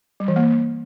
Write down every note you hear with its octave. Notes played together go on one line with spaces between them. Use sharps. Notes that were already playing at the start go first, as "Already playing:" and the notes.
G3
E3
A#3